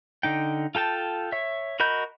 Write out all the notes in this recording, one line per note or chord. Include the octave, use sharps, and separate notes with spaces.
D3 D#4 G5
F4 A4 G5 A5
C#5 E5
F#4 A#4 D#5 B5 G6